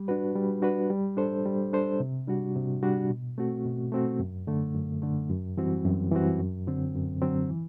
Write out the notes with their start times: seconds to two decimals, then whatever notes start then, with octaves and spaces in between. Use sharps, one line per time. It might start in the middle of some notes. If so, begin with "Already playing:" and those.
Already playing: G3
0.08 D4 F#4 B4
0.35 G3
0.62 D4 F#4 B4
0.90 G3
1.17 D4 A4 C5
1.46 G3
1.73 D4 A4 C5
2.00 C3
2.28 G3 D4 F#4
2.56 C3
2.83 G3 D4 F#4
3.10 B2
3.38 A3 C4 F#4
3.65 B2
3.92 A3 C4 F#4
4.19 F#2
4.47 D3 A3
4.75 F#2
5.02 D3 A3
5.30 F#2
5.57 E3 G3 C4 F#4
5.85 F#2
6.12 E3 G3 C4 F#4
6.39 F#2
6.67 D3 F#3 C4
6.95 F#2
7.22 D3 F#3 C4
7.49 E3